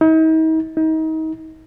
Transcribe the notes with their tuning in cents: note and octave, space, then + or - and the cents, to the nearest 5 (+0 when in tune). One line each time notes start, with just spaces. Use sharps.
D#4 +40
D#4 +30